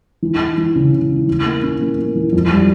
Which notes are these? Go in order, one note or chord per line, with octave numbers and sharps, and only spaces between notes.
E3
E3
E3
C#3
C#3
E3
E3
A#3
C#4
A#3
A#3
E3
F2
G3